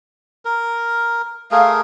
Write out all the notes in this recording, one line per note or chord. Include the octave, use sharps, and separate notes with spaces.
A#4
A3 G#4 A#4 F5